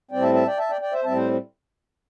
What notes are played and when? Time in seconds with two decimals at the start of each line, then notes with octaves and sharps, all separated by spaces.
0.11 A2 G3 C4 D5 G5
0.22 E5 A5
0.34 E5 A5
0.46 D5 G5
0.59 E5 A5
0.70 D5 G5
0.81 D5 G5
0.92 C5 E5
1.04 A2 G3 C4 E5 A5
1.16 C5